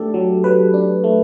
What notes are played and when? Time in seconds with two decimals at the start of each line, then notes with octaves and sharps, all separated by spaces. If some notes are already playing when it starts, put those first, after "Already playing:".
Already playing: A3 D4 G4 A4
0.14 F#3
0.44 F#3 B4
0.74 D4
1.04 A3